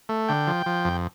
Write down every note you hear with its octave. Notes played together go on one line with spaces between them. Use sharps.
A3
D3 G5
F3
F3
F2